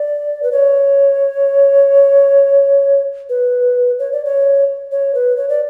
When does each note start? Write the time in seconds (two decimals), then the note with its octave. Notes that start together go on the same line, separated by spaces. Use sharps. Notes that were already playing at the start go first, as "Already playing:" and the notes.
Already playing: D5
0.43 B4
0.52 C#5
3.29 B4
3.99 C#5
4.12 D5
4.25 C#5
4.92 C#5
5.15 B4
5.37 C#5
5.49 D5